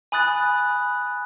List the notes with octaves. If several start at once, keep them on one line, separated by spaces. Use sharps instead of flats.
G#5 B5 D#6 F#6 A6